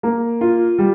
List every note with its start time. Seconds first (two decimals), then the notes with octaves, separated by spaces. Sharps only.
0.03 A#3
0.41 F4
0.79 G3